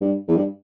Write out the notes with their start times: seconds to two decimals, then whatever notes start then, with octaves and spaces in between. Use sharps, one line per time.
0.01 G2
0.28 E2
0.36 G2